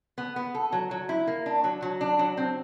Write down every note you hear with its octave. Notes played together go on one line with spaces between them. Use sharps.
B3
B3
A4
F#3
F#3
E4
A#3
D4
F#3
F#3
D4
F#3
C4